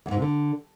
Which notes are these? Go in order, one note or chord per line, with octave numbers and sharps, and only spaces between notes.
E2
G#2
C3
D3